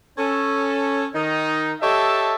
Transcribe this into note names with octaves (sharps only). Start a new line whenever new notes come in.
C#4 A4
D#3 D#4
G4 A4 C#5 D#5 E5 A5